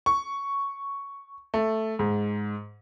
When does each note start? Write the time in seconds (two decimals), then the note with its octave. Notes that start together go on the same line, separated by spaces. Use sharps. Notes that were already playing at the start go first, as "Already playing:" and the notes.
0.06 C#6
1.54 A3
1.99 G#2